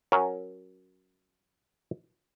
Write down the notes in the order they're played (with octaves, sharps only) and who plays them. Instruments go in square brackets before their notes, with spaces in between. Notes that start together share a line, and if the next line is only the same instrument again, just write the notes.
[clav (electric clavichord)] F#3 C#4 A#4